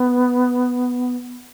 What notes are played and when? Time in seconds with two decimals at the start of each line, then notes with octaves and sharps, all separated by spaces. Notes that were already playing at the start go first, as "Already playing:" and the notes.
Already playing: B3